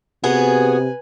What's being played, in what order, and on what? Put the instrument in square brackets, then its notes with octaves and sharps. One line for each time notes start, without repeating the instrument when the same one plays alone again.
[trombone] C3 [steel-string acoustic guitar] B3 F#4 G#4 [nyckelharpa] B4 G#5